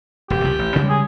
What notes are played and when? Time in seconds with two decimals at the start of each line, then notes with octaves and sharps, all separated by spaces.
0.30 E1 G4
0.44 C2 C#3 F3
0.59 A1
0.76 C#3 G3 G#3
0.89 G#4